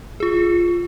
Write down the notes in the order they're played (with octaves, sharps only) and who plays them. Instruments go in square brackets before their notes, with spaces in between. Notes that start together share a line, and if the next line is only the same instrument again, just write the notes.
[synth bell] F4 G#4